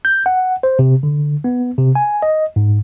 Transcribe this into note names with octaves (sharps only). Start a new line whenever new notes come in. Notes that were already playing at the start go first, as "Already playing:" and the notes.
G6
F#5
C5
C3
D3
B3
C3
G#5
D#5
G#2